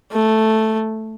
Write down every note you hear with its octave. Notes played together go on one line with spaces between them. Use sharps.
A3